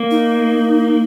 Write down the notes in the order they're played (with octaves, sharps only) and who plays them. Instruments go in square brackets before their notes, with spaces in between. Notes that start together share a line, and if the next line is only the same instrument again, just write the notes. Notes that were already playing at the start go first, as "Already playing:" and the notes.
Already playing: [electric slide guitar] A#3
[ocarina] D#4